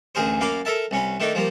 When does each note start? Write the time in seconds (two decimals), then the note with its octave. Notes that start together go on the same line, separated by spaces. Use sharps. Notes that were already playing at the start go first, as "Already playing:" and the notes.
0.15 A1 D2 G#4 A#4 C5
0.41 F#2 A#3 F5 B5 D6
0.65 A4 A#4 E5 A5
0.91 C2 C#4 B4
1.20 D#3 A3 D4 D#4
1.35 F3 G3 A#3